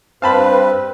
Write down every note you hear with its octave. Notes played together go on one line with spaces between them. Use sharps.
G2 C4 B4 F5 A5 B5